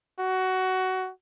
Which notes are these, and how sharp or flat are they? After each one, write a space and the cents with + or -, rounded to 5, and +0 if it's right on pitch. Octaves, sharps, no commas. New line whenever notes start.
F#4 +15